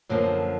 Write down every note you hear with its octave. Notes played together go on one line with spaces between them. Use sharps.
F#2 D3 F3 A#3